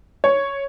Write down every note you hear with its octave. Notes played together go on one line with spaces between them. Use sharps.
C#5